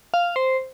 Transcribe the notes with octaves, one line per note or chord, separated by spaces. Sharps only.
F5
C5